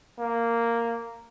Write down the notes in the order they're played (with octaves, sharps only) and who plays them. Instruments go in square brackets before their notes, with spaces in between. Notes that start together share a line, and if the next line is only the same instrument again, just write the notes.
[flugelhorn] A#3